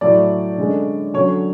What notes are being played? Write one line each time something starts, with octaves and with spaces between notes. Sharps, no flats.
A2 F#3 A3 D5
D3 G#3 C#4
D3 F#3 C#4 C#5